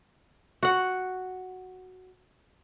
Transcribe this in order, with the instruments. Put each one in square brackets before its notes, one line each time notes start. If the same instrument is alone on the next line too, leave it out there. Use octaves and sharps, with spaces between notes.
[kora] F#4 F#5